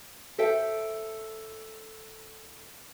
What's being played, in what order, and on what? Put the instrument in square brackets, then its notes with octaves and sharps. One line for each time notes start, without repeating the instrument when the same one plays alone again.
[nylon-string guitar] A4 C5 E5 G5